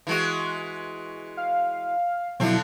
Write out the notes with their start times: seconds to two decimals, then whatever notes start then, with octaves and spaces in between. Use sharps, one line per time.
0.07 E3 G#3 F#4
1.37 F5
2.40 B2 D3 F3 F#3 C4 E4